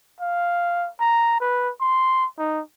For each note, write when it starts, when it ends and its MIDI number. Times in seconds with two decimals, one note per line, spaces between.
0.21 0.89 77
1.00 1.37 82
1.41 1.70 71
1.81 2.26 84
2.38 2.61 63